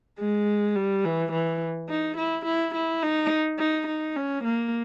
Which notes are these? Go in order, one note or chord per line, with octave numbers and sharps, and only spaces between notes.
G#3
G3
E3
E3
D#4
E4
E4
E4
D#4
D#4
D#4
C#4
A#3